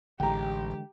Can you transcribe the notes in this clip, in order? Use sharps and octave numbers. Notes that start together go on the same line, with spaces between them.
A1 D3 E3 G#3 G4 G5 A#5